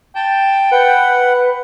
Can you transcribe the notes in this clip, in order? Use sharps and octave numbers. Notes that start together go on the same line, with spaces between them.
G5 A5
B4 F#5